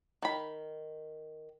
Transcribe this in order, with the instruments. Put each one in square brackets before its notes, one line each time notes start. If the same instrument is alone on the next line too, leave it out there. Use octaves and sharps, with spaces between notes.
[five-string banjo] D#3 B5